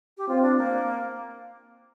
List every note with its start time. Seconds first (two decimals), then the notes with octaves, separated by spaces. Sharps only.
0.17 G4
0.28 C4 F4
0.42 D4
0.58 A#3